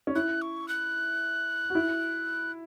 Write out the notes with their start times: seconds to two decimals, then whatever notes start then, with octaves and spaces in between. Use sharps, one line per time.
0.07 C#4
0.15 E4 F#6
0.42 C#6
0.68 F#6
1.70 F#4
1.75 E4